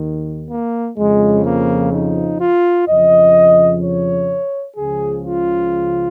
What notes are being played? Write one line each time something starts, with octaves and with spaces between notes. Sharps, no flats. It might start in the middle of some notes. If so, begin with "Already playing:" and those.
Already playing: D#2 D#3
A#3
F2 C#3 F3 G#3
A#3
D#4
F4
F2 C#3 F3 D#5
C#5
C#2 C#3 F3 G#4
F4